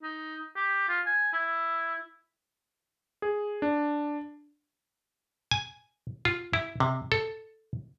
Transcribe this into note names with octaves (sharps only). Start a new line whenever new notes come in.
D#4
G4
F4
G#5
E4
G#4
D4
G#5
F4
E4
C3
A4